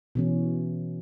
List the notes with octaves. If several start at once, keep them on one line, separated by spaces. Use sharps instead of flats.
B2 E3 C#4